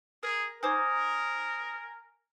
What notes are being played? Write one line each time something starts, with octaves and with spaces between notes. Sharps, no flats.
G#4 A#4
D#4 A#4 C5 G#5 D6 G#6